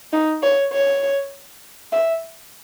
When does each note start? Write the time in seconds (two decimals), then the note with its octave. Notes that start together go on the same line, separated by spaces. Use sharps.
0.13 D#4
0.43 C#5
0.72 C#5
1.92 E5